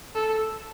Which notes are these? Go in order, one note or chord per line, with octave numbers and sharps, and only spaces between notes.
A4